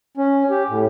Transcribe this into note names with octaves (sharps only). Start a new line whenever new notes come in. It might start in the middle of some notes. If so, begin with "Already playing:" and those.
C#4
G4
A2